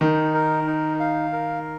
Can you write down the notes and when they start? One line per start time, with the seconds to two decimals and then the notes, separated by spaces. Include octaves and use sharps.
0.01 D#3 D#4
0.34 A#4
0.67 D#4
1.00 F5
1.33 A#4